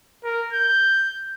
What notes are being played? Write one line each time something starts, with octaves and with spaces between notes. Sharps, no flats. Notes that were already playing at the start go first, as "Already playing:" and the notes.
A#4
G6